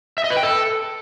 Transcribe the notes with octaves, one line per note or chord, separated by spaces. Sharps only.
E5
D#5
B4
G5
A4